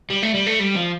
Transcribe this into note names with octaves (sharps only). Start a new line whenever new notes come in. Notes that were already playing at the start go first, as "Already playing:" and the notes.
G3
A3
G3
A3
G3
F3